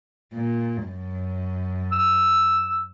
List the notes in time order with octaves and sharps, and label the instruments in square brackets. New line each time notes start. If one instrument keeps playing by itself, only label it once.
[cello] A#2
F#2
[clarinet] E6